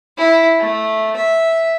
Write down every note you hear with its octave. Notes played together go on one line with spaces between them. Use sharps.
E4
A3
E5